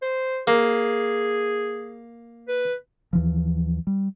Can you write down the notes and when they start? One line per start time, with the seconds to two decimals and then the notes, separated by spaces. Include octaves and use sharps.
0.02 C5
0.47 A#3 G#4
2.48 B4
3.13 D#2 E3 F3
3.87 G3